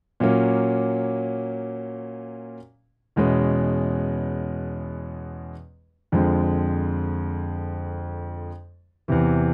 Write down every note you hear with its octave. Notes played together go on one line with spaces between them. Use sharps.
A#2 F#3 A#3 C#4
E2 B2 G#3 C#4
F2 D3 F3 G#3 C4
E2 C3 E3